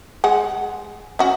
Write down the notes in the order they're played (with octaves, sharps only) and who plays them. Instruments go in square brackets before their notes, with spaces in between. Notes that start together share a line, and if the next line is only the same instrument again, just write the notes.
[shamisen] G#3 F#5
C#4 F#4